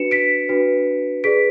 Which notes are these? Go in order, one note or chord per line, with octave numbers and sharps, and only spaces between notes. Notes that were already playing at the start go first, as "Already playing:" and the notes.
Already playing: D4 F#4 B4 C#7 E7
B6 D7
D4 F#4 B4
G#4 B4 D5 B6 D7